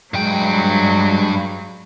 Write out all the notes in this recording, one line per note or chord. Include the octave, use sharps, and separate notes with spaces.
G2 F#3 G#3 G5